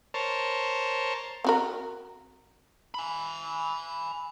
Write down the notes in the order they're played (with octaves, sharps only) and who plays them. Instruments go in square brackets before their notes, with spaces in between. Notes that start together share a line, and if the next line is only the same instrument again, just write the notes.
[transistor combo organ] A#4 C5 C#5 A5
[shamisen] C4 F#4 A#4
[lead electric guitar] G#5 B5